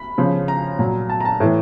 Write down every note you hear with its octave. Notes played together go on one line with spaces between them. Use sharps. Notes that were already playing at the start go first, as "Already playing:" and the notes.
Already playing: B5
C#3 F3
A#5
A#2 F#3
A5
A#5
A5
A2 E3